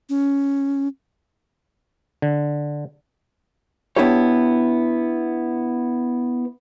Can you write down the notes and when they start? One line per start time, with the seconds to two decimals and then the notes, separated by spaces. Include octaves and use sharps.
0.09 C#4
2.22 D3
3.96 B3 D4 E4 F#4 G4 C#5